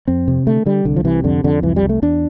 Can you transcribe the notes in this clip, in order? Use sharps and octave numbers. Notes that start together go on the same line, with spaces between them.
F2 C4
C3
D3 A3
D3 G3
C2 D3
F3
C3 E3
F2 D3
F2 D3
C2 E3
G3
C2
A3
E2 D4